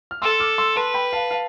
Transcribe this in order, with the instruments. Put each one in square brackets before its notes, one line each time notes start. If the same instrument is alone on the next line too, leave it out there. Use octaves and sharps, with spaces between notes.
[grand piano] F6
[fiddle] A4 [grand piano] C6 E6
[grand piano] D6 F6
C6 E6
[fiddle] B4 [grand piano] A5 C6
[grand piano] G5 B5
F5 A5
F5 A5